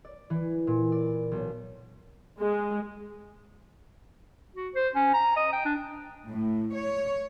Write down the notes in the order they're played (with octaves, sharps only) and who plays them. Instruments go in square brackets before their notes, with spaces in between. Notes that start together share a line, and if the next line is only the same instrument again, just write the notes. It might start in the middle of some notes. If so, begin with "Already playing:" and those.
[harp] D5
E3
A#2
D5
B1
[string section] G#3
[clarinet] F#4
C5
C#4
A#5
D#5
G5
D4
[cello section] A2
C#5